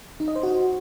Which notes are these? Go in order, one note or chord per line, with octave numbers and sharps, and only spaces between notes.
D#4
D#5
C5
F#4